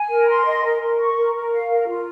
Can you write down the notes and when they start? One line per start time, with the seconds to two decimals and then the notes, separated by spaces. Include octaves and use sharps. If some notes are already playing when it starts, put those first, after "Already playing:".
Already playing: G#5
0.10 A#4
0.28 C6
0.46 D#5
0.63 A#4
0.82 A#4
0.99 C#6
1.16 A#4
1.35 A#4
1.52 F5
1.69 A#4
1.88 F4